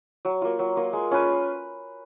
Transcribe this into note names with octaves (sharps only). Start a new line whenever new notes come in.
F#3
A#3 F4
F#3
A#3 F4
G#3
C#4 F4 B4